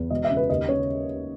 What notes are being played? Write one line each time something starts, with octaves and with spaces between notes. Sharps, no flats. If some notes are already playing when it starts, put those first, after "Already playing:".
Already playing: E2
E1 D#5
E5
C#3
B4
D#2 D#5
C#3 C#5